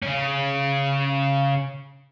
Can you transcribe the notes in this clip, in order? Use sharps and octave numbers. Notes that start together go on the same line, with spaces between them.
C#3 C#4